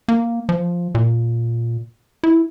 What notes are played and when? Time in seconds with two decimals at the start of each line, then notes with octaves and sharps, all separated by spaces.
0.08 A#3
0.49 F3
0.95 A#2
2.24 E4